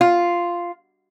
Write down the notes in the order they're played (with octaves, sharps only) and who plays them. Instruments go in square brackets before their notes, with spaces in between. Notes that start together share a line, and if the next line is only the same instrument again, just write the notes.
[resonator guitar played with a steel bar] F4